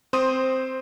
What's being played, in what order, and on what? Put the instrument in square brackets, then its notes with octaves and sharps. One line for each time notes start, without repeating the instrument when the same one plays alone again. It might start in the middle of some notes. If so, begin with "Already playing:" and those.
[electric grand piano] C4 C5 C6 D#6 D#7